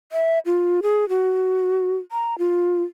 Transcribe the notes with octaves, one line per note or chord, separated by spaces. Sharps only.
E5
F4
G#4
F#4
A#5
F4